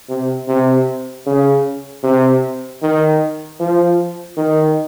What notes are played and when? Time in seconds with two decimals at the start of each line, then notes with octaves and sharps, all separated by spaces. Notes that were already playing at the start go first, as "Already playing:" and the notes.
0.09 C3
0.48 C3
1.27 C#3
2.04 C3
2.83 D#3
3.60 F3
4.37 D#3